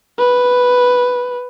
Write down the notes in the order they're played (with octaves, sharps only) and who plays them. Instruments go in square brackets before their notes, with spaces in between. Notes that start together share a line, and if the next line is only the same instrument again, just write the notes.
[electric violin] B4